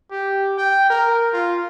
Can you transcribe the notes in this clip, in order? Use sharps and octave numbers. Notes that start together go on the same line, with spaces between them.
G4
G5
A#4
F4